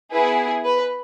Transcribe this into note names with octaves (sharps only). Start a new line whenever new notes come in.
B3 E4 G#4 B4
B4